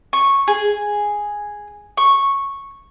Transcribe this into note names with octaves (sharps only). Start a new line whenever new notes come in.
C#6
G#4
C#6